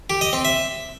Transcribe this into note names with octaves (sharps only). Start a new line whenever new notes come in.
G4
D#5
C4
E5